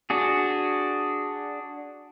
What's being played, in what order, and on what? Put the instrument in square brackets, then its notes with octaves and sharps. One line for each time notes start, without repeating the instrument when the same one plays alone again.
[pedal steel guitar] D4 F#4 G#4